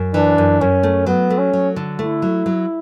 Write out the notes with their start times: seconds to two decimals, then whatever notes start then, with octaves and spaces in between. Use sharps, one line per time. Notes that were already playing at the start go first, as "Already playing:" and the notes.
Already playing: F#2
0.14 E3 D4
0.38 F#2
0.61 F#2 C#4
0.83 A3
1.06 F#3 B3
1.30 A3
1.38 C#4
1.53 F#3
1.76 D3
1.99 A3 E4
2.22 F#3
2.46 F#3